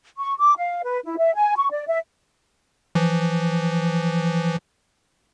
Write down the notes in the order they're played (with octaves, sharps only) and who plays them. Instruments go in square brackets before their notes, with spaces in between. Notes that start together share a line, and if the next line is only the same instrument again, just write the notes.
[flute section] C#6
D6
F5
B4
E4
E5
G#5
C#6
D5
E5
[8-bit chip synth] E3 F3